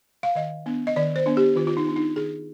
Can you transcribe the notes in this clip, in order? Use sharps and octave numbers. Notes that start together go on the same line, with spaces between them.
F5
D#3 D#5
B3 D4
D#5
D#3 D5
C5
B3 D4
G4
D#3 F4
F4
D#4
B3 D4
D#4
D#3 G#4